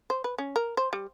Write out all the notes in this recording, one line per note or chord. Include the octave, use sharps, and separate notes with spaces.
C5
B4
C#4
A#4
C5
G3